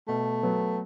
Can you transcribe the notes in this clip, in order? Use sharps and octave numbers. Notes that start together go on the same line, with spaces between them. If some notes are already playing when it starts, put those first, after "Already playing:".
B2 A3
F#3 B3